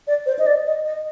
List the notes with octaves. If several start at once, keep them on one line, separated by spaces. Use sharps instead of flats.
D5
C5
D#5
D5
D#5
D#5